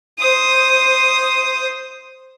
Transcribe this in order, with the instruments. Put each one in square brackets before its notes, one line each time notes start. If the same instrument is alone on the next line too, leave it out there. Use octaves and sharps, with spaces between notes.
[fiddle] C5 D#6